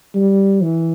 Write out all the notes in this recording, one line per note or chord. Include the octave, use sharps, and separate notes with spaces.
G3
E3